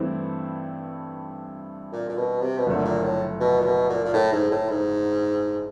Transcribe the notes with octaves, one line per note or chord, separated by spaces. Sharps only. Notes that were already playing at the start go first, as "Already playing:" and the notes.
Already playing: G2 E3 A3 C4 E4
A#2
A#2
B2
C3
B2
F#1 F#2 A#2 D3 F3 A3
A#2
A2
B2
A#2
B2
A#2
A#2
A2
G#2
A2
G#2